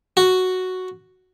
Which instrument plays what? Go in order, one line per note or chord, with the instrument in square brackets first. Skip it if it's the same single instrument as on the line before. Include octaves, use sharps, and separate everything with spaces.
[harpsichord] F#4